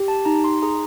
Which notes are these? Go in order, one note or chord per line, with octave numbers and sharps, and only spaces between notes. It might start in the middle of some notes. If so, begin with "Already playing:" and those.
Already playing: G4
A5
D#4 A#5
C6
G#4 A#5